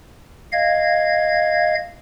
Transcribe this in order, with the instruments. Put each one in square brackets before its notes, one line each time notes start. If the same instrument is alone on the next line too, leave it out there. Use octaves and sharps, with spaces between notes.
[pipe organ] D#5 F5 G#6